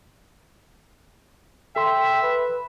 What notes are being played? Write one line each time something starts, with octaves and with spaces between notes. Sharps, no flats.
A4 E5 G5 C6
B4